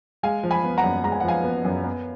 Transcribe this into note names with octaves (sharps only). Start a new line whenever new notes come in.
G#3 F5 G#5
F3
G#5 B5
B3
F#5 A#5
F#2
G#3 A#5
G#5
F#5
F3 F5 G#5
B3
F#2
B3